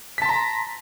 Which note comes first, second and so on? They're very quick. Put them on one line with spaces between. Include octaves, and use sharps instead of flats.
B6 A5 C6 A#5